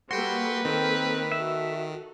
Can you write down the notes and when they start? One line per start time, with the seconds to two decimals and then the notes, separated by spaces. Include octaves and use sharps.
0.11 G3 A#3 F#4 A4 B4 G5 C6
0.65 D#3 A#3 C4 A4 A#4
1.32 F#4 A4 E5